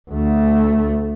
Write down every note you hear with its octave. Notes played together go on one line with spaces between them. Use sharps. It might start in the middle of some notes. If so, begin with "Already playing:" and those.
D2 A3